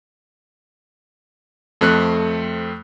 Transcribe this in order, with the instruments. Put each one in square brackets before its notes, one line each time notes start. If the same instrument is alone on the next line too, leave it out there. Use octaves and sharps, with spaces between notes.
[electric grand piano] F2 A3 C4 F#6